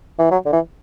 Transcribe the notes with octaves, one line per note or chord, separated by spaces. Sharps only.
E3
F#3
D3
E3